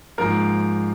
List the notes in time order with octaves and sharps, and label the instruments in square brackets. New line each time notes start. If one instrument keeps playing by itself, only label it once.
[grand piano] G#2 F3 A#3 A#4